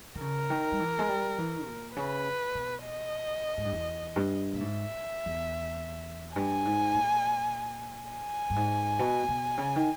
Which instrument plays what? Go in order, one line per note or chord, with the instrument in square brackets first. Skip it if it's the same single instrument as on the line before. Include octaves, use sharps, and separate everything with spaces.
[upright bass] D#3
[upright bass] C#3 [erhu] A#4
[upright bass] D#3
G3
E3
G#3
G3
E3
A#2
[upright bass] C#3 [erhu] B4
[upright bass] B2
[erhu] D#5
[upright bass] G#2
G2
E2
G2
A#2
[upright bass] G#2 [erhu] E5
[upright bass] E2
[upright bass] G2 [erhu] G#5
[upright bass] G#2
A#2
[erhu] G#5
[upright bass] G2
G#2
B2
B2
C#3
D#3